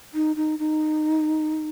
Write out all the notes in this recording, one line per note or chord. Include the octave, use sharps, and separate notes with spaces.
D#4
D#4
D#4